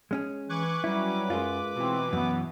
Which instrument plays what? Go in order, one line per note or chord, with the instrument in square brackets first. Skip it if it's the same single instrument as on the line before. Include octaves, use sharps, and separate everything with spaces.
[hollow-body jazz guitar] G#3 C#4 G#4
[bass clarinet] E3 [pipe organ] B4 D6 [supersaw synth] C#6 F#6 G#6
[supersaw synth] F#3 C#4 [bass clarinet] G3 [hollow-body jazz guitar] E4
[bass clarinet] F#2 [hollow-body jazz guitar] G#3 F4
[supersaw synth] B2 E3 [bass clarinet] C4
[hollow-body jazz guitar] F#2 [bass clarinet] B3